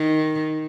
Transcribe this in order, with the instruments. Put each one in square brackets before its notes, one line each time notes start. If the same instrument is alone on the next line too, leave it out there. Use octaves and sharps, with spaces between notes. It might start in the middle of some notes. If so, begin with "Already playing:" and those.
Already playing: [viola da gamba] D#3